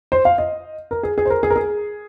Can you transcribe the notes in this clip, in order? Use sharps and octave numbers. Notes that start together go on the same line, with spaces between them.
C5
F5
D#5
A#4
G#4
G#4
C5
A#4
G#4
A#4
G#4